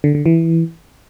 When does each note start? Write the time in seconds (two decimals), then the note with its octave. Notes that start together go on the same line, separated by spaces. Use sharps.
0.04 D3
0.15 D3
0.26 E3